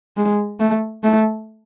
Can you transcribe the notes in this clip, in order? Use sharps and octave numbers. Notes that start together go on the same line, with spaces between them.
G#3
A3
A3